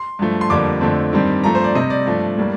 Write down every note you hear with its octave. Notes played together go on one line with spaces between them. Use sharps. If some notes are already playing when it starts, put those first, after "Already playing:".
Already playing: C6
G2 F3 A3
C6
F2 D3 G3 A#3 D6
F2 D3 A3 C4
G2 D#3 G3 C4
G2 F3 A3 A#5
C5
D5
C3 G3 C4 D#5
D5
G2 F3 A3
A2 G3 A#3